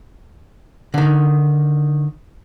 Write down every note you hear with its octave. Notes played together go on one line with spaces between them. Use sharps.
D3 D#3